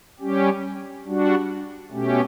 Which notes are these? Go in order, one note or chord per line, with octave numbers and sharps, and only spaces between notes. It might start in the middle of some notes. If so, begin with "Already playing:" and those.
G3 C#4 G4
G3 D4 F#4
B2 A3 C#4 G4